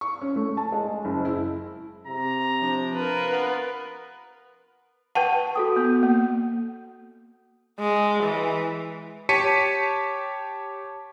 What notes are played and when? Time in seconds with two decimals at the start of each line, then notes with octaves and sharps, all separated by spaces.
0.01 C#6
0.21 C#4
0.36 A3
0.57 A5
0.72 G#3
1.05 F#1
1.25 E4
2.07 C3 A#5
2.62 F3 D4
2.94 F4 A#4 B4
3.32 B3
5.15 B4 F#5 G5 A5 C#6 D#7
5.56 F#4 A4 D#6
5.76 B3
6.03 A#3
7.80 G#3
8.23 E3
9.29 G4 C#5 A5 B6 C#7 D#7